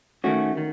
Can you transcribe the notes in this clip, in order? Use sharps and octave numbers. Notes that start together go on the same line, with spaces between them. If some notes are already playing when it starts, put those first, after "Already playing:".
D#3 A3 C#4 F#4
D#3